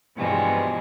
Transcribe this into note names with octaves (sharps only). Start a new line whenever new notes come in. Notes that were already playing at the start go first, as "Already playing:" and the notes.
G2 B2 E3 F3 G3 G#3